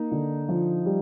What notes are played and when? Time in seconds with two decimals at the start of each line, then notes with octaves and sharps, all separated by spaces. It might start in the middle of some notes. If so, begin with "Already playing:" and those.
Already playing: A#3 D#4
0.11 D3
0.49 F3
0.85 G3